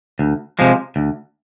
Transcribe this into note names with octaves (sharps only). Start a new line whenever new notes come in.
D2
C3 F3 G#3
D2